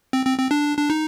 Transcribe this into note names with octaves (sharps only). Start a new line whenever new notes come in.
C4
C4
C4
D4
D4
D#4